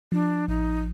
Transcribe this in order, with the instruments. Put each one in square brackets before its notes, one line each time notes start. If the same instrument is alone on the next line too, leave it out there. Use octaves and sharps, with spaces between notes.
[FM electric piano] F3 [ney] D4
[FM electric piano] A1 [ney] D#4